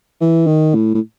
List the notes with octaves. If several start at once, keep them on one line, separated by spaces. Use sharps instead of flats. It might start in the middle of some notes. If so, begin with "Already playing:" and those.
E3
D#3
A2
A2